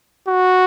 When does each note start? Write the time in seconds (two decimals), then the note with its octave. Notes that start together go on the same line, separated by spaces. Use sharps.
0.28 F#4